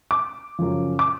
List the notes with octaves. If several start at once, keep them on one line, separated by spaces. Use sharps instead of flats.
D6
F#2 C#3 F3
D6